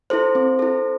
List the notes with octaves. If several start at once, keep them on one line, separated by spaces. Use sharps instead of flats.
E4 A4 C5
C4
E4 A4